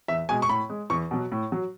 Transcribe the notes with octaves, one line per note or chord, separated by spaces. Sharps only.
E2 E5
B2 G#3 G#5
C#6
A2 B5
G#3
E2 C#6
B2 F#3
A2
F#3